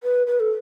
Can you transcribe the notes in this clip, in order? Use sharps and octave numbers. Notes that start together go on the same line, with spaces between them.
B4
B4
A4